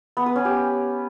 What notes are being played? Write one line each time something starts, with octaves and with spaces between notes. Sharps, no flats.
B3
B4
C#4
G4